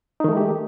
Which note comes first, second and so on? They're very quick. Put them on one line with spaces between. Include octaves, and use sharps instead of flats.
D#4 D#3 A3 G#3 G4